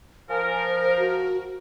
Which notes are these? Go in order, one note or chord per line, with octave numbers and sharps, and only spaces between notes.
F3 A#4 G#5
C5
F#4